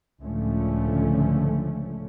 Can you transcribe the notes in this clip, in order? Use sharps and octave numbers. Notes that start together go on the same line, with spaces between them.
C#2 A2 D3 F3 A3 C#4